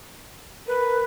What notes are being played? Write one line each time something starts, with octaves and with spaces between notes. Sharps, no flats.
A#4 B4